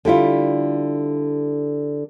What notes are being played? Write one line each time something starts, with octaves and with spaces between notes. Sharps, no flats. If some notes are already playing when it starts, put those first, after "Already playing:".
D3 G3 E4 F4